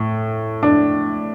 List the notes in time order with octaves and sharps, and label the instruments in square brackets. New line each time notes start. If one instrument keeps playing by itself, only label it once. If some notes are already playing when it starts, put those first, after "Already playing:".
Already playing: [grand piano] A2
D4